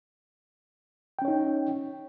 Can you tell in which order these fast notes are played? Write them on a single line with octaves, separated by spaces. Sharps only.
G5 C#4 C#5 D#4